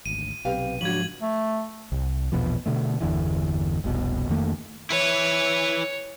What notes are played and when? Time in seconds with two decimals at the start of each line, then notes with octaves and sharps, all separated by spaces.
0.06 G#1 D2 D#7
0.45 B1 C3 G4 B4 F5
0.81 G#2 C#3 F3 F#3 D4 F#4 G#6 F#7
1.21 A3
1.92 C2
2.32 A#1 E2 B2 F3
2.66 B2 D3 A3
3.00 G1 E2 D3 E3
3.84 F1 C2 B2
4.29 F2 D#3 A3 A#3
4.90 E4 B4 C#5